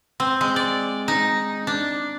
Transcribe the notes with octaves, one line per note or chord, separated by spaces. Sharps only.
C4
G#3
D5
D#4
D4